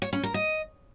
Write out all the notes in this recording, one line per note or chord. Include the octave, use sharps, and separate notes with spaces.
C#5
C#4
A#4
D#5